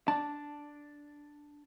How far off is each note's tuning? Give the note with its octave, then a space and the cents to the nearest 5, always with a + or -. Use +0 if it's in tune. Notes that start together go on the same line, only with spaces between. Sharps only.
D4 +0 A5 +0